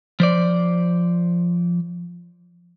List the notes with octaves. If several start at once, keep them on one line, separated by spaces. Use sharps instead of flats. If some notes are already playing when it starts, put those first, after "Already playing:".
F3 C5 D5